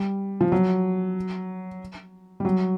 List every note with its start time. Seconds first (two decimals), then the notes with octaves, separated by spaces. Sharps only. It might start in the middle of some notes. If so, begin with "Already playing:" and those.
Already playing: G3
0.41 F3
0.52 F#3
2.40 G3
2.45 F#3